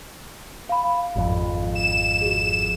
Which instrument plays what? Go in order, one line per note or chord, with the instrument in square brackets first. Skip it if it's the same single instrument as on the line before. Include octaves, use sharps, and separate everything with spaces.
[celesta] F5 B5
[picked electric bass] G#1 F2
[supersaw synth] E7
[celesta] F#4 G#4